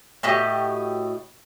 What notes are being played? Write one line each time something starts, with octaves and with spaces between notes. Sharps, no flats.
A2 F#4 G4 D#5